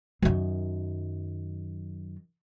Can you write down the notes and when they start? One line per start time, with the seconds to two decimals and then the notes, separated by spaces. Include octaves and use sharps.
0.22 F#2 D#3